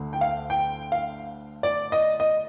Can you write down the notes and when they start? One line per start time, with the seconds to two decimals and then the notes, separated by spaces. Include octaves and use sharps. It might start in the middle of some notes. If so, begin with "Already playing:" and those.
Already playing: D2 D3
0.13 G5
0.21 F5
0.50 G5
0.92 F5
1.63 D5
1.92 D#5
2.20 D#5